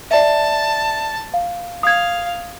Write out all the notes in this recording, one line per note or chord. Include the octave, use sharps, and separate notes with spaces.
D5 E5 A5
F5
F5 D#6 G#6